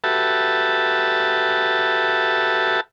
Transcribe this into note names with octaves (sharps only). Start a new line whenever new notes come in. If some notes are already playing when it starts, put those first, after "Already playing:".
F#4 G4 A4 B4 E5 A5